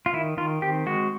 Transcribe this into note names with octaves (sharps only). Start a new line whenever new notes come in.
F4
D#3 E4
D#3 F4
C4 G4
G#3 F#4